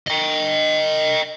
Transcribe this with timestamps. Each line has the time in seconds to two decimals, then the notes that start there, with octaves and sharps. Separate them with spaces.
0.08 D#5 G5